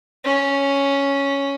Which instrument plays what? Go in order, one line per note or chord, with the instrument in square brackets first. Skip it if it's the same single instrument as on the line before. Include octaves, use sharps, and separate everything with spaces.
[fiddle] C#4